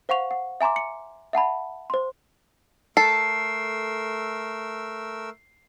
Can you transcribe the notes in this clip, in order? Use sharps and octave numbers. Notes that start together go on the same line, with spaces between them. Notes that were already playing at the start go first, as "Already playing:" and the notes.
C5 F5 F#5 C#6 F7
F#5
E5 G#5 A#5 C6 D6
C#7
E5 F#5 A5 B5
C5 C6
A3 A4 A#4 E6 C7